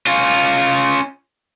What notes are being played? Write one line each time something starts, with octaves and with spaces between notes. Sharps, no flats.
C#4 F4